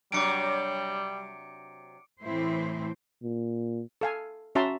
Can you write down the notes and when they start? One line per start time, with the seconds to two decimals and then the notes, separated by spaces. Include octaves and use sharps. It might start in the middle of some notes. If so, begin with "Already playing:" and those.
0.12 C3 F#3 G3 D4 D6 C#7 D7
2.23 A2 E3 A3 C4 E4 C5
3.23 A#2
4.01 A4 F5 G#5
4.55 C#4 F#4 E5 A5 A#5 C6